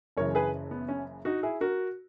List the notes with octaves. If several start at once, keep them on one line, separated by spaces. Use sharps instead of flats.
F#1 F#2 C#3 E3 A#4 C#5
G#4 B4
B3
C#4
D#4 F#4
E4 G#4
F#4 A#4